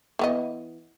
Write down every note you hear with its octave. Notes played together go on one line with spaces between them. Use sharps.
E3 B3 D#5